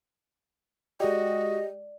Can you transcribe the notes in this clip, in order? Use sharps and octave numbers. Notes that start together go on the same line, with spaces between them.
G#3 F#4 G4 D5 D#5